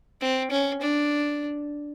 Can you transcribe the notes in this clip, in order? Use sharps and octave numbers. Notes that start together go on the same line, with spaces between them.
C4
C#4
D4